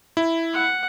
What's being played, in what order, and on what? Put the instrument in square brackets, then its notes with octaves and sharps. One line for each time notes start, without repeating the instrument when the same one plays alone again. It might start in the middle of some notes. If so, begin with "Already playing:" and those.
[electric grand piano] E4
[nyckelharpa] F#5